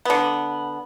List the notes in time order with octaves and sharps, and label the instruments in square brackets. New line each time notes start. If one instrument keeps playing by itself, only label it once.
[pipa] D3 B3